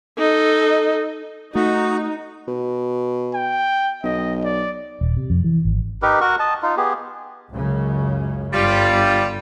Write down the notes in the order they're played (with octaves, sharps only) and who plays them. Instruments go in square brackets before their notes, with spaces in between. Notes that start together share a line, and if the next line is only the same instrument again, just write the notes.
[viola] D#4 A4
[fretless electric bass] A3 [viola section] D#4 [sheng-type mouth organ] F#4
[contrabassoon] B2
[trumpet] G5
[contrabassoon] B1 [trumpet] D#5
[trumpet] D5
[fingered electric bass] D#1
C3
F2
E3
G#1
[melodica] D#4 G4 A#4 B4
F#4 A#4 F#5 C#6
D#5 A5
D#4 F4
B3 G4 G#4
[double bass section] C#2 F#2 C#3
[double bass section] G1 [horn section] G3 F4